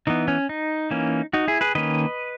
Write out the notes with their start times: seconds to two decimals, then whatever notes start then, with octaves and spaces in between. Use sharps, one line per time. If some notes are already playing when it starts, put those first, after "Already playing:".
0.07 E3 B3 D#4
0.28 C#4
0.49 D#4
0.91 E3 A#3 C#4
1.33 D#4 F#4
1.48 E4 G#4
1.61 G#4 B4
1.75 D#3 A#3 C#4 B4 D#5